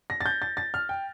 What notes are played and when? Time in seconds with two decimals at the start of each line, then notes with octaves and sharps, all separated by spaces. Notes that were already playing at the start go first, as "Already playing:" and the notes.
0.10 A#6
0.21 A6
0.26 G6
0.42 A6
0.57 A6
0.74 F6
0.89 G5